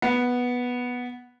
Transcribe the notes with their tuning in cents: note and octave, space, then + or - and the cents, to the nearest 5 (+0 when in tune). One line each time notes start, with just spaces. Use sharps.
B3 -5